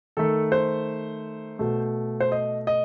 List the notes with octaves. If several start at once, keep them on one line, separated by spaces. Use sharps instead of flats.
D#3 A3 A4
C5
B2 A3
C5
D#5
D#5